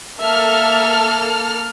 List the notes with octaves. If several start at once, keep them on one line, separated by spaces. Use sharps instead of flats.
A#3 A4 E5 F6